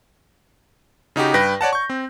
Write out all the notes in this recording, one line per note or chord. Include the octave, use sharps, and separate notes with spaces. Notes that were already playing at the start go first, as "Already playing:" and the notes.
C#3 D#4 F#4 G4
G2 B4 G5 A#6
C#5 D5 F#5 A5
C#6 G6
C4